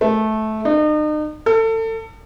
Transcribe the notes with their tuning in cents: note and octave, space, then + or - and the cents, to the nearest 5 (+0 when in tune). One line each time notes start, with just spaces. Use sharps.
A3 -15
D#4 -40
A4 +30